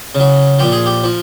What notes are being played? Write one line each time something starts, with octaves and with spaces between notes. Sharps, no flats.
C#3 F#3
A#2 F3 G4
G#4
G4
F3